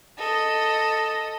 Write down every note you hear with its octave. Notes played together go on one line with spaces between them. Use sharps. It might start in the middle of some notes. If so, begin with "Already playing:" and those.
A4 D#5